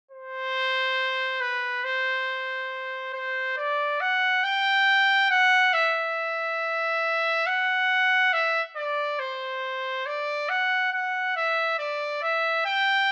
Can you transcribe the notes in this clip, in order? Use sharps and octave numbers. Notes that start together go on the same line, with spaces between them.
C5
B4
C5
C5
D5
F#5
G5
F#5
E5
F#5
E5
D5
C5
D5
F#5
F#5
E5
D5
E5
G5